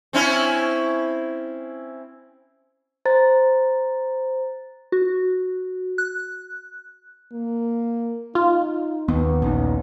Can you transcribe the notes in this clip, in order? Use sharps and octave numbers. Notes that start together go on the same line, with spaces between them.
C4 C#4 E4
C5 A#5 A6
F#4
F#6
A#3
D#4 F4
D#2 B3
A#1 D#2 D#3 C#4